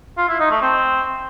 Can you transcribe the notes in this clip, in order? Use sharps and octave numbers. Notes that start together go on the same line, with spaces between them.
F4
E4
D#4
A3
C4